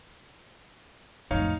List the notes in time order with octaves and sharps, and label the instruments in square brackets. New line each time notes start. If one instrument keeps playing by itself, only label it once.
[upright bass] F2 A2 [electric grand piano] D#4 C#5 F5